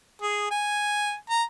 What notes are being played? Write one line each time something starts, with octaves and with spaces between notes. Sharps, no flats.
G#4
G#5
A#5